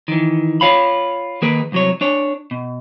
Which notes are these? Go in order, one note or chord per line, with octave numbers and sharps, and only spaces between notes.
D#3 E3
F4 C#5 F5 B5
D#3 A#3 G#4 A#4 B4
C2 F#3 C#5
D4 C#5
B2